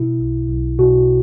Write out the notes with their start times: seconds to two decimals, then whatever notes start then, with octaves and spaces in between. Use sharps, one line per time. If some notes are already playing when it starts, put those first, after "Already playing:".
Already playing: B2 E4
0.19 B1
0.49 B1
0.78 B2 F#4